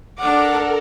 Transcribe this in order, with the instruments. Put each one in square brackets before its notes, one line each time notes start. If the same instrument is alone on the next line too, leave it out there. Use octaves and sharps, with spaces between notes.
[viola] D4 D6 [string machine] A4 A#4 [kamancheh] F#5 F6